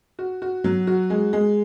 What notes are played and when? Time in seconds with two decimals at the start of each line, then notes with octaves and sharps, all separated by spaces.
0.19 F#4
0.42 F#4
0.64 F#3
0.87 F#4
1.10 G#3
1.33 G#3